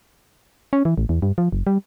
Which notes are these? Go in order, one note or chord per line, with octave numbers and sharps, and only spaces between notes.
C#4
E3
A1
E2
G2
F3
F#1
G3